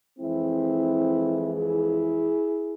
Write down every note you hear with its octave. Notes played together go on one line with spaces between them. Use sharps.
F2 E3 G#3 C4 E4
E4 G#4